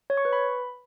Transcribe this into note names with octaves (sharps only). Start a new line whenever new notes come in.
C#5
C#6
B4
B5